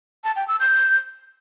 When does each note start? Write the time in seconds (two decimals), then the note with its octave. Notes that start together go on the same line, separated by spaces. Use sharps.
0.24 A5
0.36 G5
0.48 E6
0.60 G6